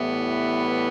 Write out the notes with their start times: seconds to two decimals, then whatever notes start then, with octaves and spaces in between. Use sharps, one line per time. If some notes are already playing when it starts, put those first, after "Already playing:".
Already playing: A2 E3 G3 B3